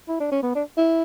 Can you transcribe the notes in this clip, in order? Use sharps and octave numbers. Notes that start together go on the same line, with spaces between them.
E4
D4
C#4
B3
D4
E4